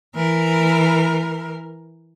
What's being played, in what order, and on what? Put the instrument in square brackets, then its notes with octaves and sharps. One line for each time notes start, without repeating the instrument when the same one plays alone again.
[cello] E3 A#4